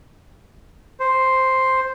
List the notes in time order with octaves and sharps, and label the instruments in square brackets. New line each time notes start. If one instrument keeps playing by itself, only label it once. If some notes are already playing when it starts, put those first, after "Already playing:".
[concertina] C5